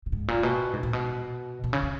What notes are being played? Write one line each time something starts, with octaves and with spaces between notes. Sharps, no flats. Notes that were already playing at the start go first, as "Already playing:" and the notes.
A#2
G#2
A#2
B2
G#2
A#2
B2
B2
C#3
C#3